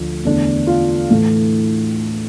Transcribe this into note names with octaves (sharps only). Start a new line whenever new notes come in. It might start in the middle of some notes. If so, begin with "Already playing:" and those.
Already playing: D2 D3 F3
E2 D3 A3 D4
F4
A2 E3 A3